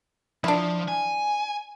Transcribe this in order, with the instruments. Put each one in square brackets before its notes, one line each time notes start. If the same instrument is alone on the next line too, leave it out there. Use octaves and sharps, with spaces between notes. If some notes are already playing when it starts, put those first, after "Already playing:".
[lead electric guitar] F3 [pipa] D4 E4
[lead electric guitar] G#5